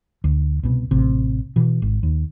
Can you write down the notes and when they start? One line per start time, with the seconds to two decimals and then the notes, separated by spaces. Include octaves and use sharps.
0.24 D2
0.63 C2 B2
0.91 A1 C3
1.56 B2 E3
1.82 G#1
2.03 D#2